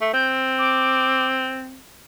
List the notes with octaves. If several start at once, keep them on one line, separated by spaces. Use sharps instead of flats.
A3
C4 G6
D6